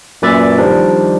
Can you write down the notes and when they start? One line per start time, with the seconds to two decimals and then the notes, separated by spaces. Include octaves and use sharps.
0.22 F#2 A#2 B4 D5 E5 A6
0.58 D#3 F3 G3 D4